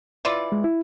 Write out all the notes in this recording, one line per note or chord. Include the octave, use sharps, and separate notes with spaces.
E3 F4 D5
G#3
E4